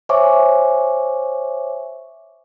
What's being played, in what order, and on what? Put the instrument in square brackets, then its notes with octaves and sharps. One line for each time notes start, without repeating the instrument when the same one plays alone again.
[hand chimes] C5 C#5 E5 G#5 C#6 D6